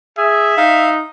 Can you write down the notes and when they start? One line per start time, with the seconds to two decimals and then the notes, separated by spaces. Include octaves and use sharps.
0.18 G#4 E5
0.57 D#4 F5